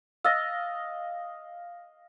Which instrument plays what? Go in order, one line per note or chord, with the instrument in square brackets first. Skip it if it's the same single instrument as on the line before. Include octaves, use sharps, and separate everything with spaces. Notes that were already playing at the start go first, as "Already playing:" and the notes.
[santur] D#5 F5 [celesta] E6 A6 A#6